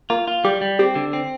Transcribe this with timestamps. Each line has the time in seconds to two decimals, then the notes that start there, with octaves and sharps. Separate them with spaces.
0.10 A#3 F4
0.28 F4
0.45 G3 G4
0.61 G3
0.79 C4 G4
0.95 D3
1.13 C4